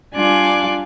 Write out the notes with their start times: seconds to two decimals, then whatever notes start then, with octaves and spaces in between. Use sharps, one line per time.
0.14 G3 D4 F4 G#5 D6 F#6